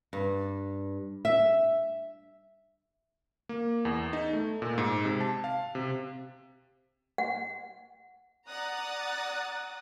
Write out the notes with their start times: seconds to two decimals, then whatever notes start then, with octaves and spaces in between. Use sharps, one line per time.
0.13 G2
1.25 E5
3.49 A#3
3.85 E2
4.13 D#4
4.33 A3
4.62 A#2
4.78 G#2
5.05 C3
5.21 A5
5.44 F5
5.75 C3
7.18 F#5
8.49 D5 F#5 A#5 D#6 F#6 A6